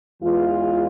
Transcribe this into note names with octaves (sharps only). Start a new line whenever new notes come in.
E2 E3 G#3 F4